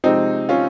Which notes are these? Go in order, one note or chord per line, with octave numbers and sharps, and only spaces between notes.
C3 F3 G#3 C4 D#4
C#4 F4